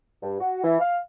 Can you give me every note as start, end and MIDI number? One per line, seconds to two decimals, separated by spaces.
0.23 0.40 43
0.40 0.61 66
0.64 0.78 52
0.80 0.99 77